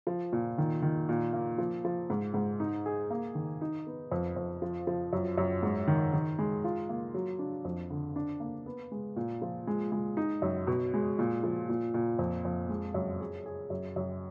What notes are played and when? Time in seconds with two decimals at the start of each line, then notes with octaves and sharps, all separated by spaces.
0.07 F3
0.33 A#2
0.58 D#3
0.82 D#3
1.09 A#2
1.33 A#3
1.58 F3
1.85 F3
2.10 G#2
2.34 G#2
2.60 D#4
2.86 G#4
3.10 A#3
3.35 D#3
3.61 D#4
3.87 B3
4.12 F2
4.36 F2
4.62 F3
4.87 F3
5.13 F#2
5.38 F#2
5.63 G#2
5.88 D#3
6.13 D#3
6.39 G#3
6.64 F4
6.89 A#3
7.14 F#3
7.39 D4
7.65 F2
7.90 D3
8.16 D4
8.40 A#3
8.66 B3
8.92 G#3
9.16 A#2
9.42 F3
9.67 G#3
9.92 G#3
10.17 D#4
10.42 F#2
10.67 B2
10.94 G#3
11.19 A#2
11.43 F3
11.69 A#2
11.94 A#2
12.19 F2
12.45 F2
12.69 G#3
12.94 F#2
13.20 G#4
13.46 G#4
13.70 F#2
13.96 F#2